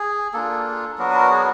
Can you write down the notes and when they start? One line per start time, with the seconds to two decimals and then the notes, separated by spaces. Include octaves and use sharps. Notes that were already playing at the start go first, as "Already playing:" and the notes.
Already playing: G#4
0.34 A#3 D4 F4 A4
0.98 F#3 B3 D4 F#4 A#4
1.10 B4
1.14 A#4
1.30 G#4